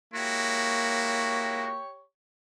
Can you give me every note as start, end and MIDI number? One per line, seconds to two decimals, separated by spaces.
0.14 1.67 56
0.14 1.82 58
0.14 1.67 64
0.14 1.67 66
0.14 2.01 67
0.14 2.01 73
0.14 2.01 85